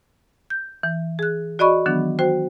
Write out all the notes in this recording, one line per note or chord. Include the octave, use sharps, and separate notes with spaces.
G6
E3
G#4 F#6
F#4 D5 D#5 B5 C#6
D#3 E3 F#3 B3 D4
F#4 C5 G5